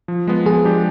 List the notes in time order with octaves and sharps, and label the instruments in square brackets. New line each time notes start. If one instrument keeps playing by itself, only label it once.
[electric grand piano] F3
G#3 B3
[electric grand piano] F3 [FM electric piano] G#4
[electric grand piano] G#3 D4 G4